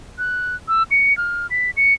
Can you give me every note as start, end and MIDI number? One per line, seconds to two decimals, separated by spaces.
0.18 0.56 90
0.68 0.83 88
0.91 1.16 97
1.18 1.47 89
1.50 1.71 95
1.77 1.94 97